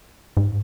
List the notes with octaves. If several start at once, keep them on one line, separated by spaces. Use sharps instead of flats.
G#2